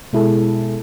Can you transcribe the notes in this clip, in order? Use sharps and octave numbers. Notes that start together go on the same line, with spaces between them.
B2 G#3 E4 G#4 A4